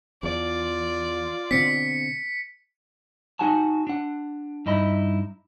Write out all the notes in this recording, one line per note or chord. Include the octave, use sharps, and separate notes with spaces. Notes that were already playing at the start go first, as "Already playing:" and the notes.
E2 F4 D5
B2 D3 C4 B6 C#7
D#4 F#4 F#5 G#5 A5
D4 F#5
G2 D#4 E4 D#5 B5